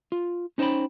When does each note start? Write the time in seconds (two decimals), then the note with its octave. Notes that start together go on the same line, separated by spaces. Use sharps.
0.12 F4
0.58 C#4 D#4 C5 F#5 G5 B5